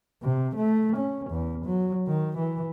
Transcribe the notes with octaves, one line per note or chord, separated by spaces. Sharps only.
C3
A3
C#4
E2
F#3
D#3
E3